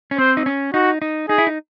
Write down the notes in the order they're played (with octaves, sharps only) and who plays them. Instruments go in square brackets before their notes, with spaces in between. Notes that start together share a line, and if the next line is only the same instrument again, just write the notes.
[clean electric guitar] C#4
[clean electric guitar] C4 [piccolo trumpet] C5
[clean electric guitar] D#4
C#4
[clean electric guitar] D#4 [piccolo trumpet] F#4
[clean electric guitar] D#4
[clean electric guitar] D#4 [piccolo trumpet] G#4
[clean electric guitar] E4
D#4